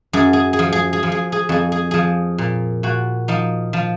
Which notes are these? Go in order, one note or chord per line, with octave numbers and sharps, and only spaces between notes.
F#2 G#4
G#4
G#4
F3
G#4
G#4
F3
G#4
G#4
F2 G#4
G#4
F3 G#4
A#2
A#2 F#4
F3 D#4
F3